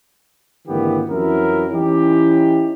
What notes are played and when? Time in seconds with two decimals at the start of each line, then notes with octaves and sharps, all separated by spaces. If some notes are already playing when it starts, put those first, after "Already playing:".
0.67 G#1 D3 E3 A#3 B3 G4
1.08 F2 E3 F#3 C#4 E4 A#4
1.70 E3 C#4 D#4 E4 G4